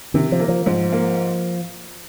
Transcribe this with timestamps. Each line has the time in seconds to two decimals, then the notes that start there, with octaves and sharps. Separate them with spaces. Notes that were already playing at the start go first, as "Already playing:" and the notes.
0.14 C3 D#3
0.32 F3
0.40 A#3
0.49 F3
0.66 G#2 F3
0.92 A#3